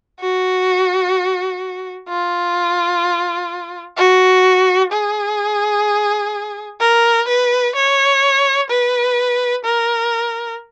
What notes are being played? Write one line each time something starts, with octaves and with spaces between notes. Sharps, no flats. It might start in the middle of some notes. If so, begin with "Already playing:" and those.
F#4
F4
F#4
G#4
A#4
B4
C#5
B4
A#4